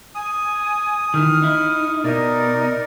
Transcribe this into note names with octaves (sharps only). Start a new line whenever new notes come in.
G#5 D#6
D#3 E3 F6
D#4 E4
B2 D#4 A#4 D5